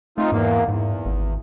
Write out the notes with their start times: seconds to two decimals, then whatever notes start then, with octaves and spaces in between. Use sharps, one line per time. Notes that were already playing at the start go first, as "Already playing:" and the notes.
0.18 A3 C4 D#4 F4
0.32 E2 G#2 A#3
0.68 E2 G#2
1.06 G#1